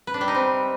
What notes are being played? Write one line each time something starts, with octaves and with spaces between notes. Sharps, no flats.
B4
D4
G3
D#4
C4